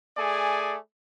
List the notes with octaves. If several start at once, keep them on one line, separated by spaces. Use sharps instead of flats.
A3 G#4 D5 G#5